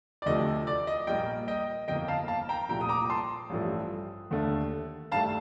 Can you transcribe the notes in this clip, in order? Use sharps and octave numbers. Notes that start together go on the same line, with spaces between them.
D5
D2 C3 F3 A3 D#5
D5
D#5
A#1 A#2 G3 A#3 D#5 G5
D#5 G5
G1 F2 D#3 A#3 D#5 G5
F5 A5
F5 A5
G5 A#5
C2 A#2 F3 A3 G5 A#5
D#6
A#5 D6
A5 C6
A1 G2 F3 A3
D#2 D3 A3
G2 D#3 A3 F5 A5